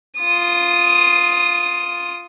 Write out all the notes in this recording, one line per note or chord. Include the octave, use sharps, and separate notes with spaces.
F4 D#6